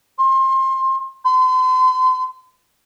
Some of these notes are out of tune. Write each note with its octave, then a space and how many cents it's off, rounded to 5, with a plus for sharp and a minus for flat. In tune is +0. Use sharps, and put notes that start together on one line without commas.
C6 +25
C6 -40